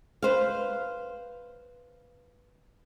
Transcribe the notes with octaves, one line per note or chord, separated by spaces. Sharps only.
B4 C5 F5